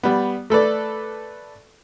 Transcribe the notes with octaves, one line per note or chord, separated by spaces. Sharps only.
G3 B3
A3 A4 B4 D5